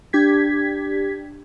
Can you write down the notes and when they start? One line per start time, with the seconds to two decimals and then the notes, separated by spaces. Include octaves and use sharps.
0.13 D4 G4 G#6 B6